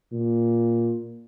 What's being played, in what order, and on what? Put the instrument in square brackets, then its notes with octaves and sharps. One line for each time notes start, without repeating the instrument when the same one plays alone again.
[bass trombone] A#2